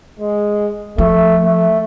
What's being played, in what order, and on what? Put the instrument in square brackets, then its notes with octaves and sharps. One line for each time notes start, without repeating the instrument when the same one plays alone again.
[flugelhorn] G#3
[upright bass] F3 [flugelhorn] A3
[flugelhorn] A3